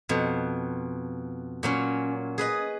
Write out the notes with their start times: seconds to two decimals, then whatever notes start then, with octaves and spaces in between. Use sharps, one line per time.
0.09 F2 B2
1.63 A#2 F#3 C#4
2.38 G#4 B4 D#5